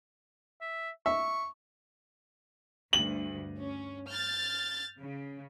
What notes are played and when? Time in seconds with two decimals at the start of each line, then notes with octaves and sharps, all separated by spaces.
0.61 E5
1.06 E5 C#6
2.93 D2 G2 F#7
3.58 C#4
4.07 F6 G6 A6
4.98 C#3